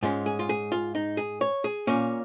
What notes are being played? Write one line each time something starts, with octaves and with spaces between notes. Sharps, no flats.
G#2 G#3 C#4 F4
G#4
F4
G#4
F4
D#4
G#4
C#5
G#4
A#2 A#3 C#4 C#5